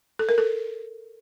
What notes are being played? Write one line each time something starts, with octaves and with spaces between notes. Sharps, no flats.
A4
A#4
A4